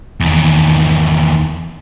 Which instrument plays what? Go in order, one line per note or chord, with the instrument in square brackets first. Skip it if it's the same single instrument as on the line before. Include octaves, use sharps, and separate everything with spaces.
[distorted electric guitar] E2 D#3